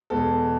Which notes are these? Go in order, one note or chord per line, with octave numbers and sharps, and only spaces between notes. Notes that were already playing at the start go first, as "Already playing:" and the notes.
E2 B2 G#3 A4